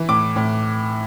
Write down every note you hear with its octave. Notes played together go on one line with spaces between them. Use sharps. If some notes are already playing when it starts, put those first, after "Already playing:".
Already playing: E3
A2 D6
A2